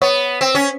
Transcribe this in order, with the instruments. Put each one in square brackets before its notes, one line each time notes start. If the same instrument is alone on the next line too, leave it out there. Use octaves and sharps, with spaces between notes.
[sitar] B3 [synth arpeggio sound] C#5
[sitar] C4
C#4